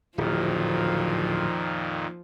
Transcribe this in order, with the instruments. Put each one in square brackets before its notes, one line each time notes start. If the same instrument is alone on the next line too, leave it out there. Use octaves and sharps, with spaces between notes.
[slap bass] D1 [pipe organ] F2 A#2 D#3 [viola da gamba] F3